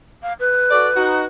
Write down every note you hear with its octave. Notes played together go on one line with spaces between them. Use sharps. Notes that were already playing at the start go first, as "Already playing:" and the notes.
F5
B4
F#4 A4 D5
D#4 F#4